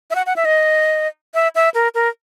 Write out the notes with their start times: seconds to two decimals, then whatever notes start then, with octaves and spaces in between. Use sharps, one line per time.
0.11 E5
0.15 F#5
0.26 F#5
0.36 E5
0.45 D#5
1.34 E5
1.55 E5
1.74 A#4
1.95 A#4